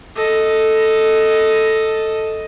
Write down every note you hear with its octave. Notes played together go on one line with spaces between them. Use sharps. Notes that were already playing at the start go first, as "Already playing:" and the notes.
A4 D#5